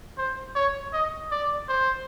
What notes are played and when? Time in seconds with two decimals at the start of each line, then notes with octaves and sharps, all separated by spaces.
0.18 C5
0.56 C#5
0.93 D#5
1.32 D5
1.69 C5